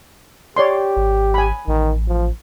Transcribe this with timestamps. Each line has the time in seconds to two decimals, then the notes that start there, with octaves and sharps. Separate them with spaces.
0.57 G4 C#5 D5 C6
0.96 G#1
1.34 G#5 B5
1.67 A1 D#3
2.08 F3